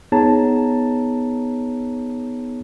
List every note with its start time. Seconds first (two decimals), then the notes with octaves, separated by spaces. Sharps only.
0.12 B3 D#4 G#4 C#5 A5 A#5